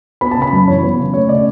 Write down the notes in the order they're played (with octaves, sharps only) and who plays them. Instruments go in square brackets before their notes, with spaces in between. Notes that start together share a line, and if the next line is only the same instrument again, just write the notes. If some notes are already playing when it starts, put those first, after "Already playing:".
[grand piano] B3 B5
A5
C#3
B5
F#2
E3 C#5
B3
C#3
A3 C#5
C#3 D5